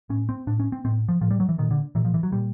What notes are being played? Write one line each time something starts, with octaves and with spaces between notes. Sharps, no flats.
A2 C#4
C4
A2 D4
C#4
C4
A2 C4
F3
A2 F3
G3
F#3
E3
A#2 D#3
D3
A#2 E3
F3
E3
F#3
A#2 G3